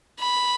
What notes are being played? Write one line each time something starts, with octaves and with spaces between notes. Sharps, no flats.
B5